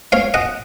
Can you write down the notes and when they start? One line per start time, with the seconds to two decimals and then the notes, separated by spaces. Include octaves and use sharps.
0.12 C#5 F5
0.34 D#5 F#5